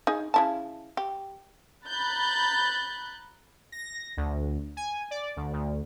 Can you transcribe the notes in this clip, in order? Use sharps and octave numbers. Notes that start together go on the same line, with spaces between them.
D#4 G#4
C#3 E4 A5
G4
A#5 B5 F#6 G6 A6
A#6
D2
G#5
D5
D2
D2